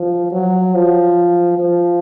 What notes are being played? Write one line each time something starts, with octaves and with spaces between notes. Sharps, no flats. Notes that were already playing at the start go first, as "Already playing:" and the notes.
Already playing: F3
F#3
F3
F3